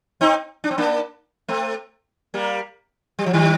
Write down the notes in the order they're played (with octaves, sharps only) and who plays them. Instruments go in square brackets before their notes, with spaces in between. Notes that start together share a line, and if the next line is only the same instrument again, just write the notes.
[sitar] C4 D#4
D4
C4
A#3 D4
A3 C4
G3 A#3
G3
F3
D#3 G3